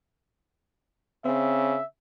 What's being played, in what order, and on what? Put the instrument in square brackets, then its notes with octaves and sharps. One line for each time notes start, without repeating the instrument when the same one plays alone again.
[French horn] C#3 [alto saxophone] C4 [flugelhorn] E5